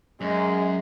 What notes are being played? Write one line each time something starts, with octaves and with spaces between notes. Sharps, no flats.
F#2 G#3